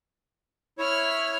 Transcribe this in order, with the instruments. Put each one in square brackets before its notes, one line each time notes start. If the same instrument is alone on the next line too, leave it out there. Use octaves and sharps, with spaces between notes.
[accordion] E4 C#5 [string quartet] B5 F6